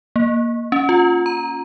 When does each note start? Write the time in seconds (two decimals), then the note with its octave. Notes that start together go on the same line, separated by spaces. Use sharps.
0.16 A#3
0.72 C#4
0.89 F4
1.26 A#5